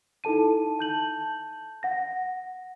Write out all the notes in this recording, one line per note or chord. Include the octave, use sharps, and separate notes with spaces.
D#4 E4 A4 A5 D#7
A5 G6 F#7
F#5 A#6